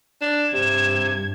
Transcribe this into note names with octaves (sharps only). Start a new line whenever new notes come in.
D4 E7
G2 C3 G#6